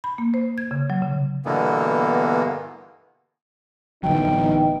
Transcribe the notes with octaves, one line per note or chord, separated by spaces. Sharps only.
B5
A#3
C5
G#6
C#3
F#3
C#3
G2 B2 D3 E3 A#3 B3
A1 D3 E3 F#3 B3 D#4 G5